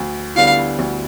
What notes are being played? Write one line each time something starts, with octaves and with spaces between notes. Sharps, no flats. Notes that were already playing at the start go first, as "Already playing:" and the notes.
Already playing: D2
D3 G3 B3 E4 F5
D2